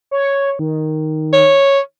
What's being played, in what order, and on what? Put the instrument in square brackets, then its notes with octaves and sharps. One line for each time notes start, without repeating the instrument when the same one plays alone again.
[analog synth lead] C#5
D#3
[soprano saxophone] C#5